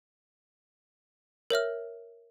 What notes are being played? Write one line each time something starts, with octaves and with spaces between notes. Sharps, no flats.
A#4 C#5 E5 F6